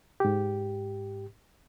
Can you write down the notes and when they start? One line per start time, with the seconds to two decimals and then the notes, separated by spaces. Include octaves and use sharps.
0.20 G#2 G4